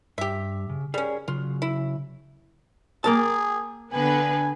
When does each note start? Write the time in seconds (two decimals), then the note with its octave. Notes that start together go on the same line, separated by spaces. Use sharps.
0.18 G2 G4 E5
0.69 C#3
0.94 G3 C#4 G#4 A#4
1.28 C#3 F#3 F4
1.62 E4
3.04 A#3 G#4 A#4 A5
3.93 D3 B3 B4 G#5